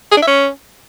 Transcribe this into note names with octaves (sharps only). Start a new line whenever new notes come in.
G#4
D4
E5
C#4